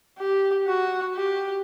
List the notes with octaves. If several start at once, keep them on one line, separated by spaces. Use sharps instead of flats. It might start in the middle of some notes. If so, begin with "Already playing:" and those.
G4
F#4
G4